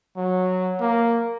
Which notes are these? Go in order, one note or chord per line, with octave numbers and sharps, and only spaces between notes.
F#3
A#3